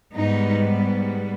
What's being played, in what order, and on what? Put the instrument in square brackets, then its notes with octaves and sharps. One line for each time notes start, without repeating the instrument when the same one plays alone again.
[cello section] G#2 G3 B3 D#4